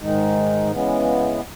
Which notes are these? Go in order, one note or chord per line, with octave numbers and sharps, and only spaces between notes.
G#2 D#3 G#3 D#4
C#3 E3 G#3 B3